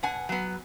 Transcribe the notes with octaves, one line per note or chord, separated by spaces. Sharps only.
B2 F#5 G#5
F#3 B3